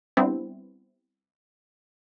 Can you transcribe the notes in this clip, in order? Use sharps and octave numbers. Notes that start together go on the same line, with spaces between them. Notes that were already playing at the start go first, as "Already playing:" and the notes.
G3 B3 C4 D4 E4